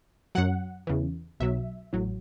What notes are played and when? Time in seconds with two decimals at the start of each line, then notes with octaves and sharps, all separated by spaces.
0.35 F#2 F#3 F#5
0.87 E2 C#3 E3
1.40 B1 B2 F#3 E5
1.93 A1 A2 F#3